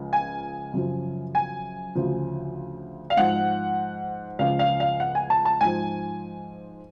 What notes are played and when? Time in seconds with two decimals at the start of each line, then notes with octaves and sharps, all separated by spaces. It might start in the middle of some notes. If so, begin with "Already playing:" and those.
Already playing: C#2 C#3 F3
0.13 G#5
0.74 F#2 C#3 F3
1.35 G#5
1.95 D2 C#3 F3
3.10 F5
3.17 G#2 F3 F#5
4.39 C#2 C#3 F3 F5
4.59 F5
4.80 F5
5.00 F#5
5.15 G#5
5.30 A5
5.45 A5
5.61 G#2 F3 G#5